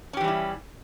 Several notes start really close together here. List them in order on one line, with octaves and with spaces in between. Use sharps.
C#4 G4 E3 G3 E4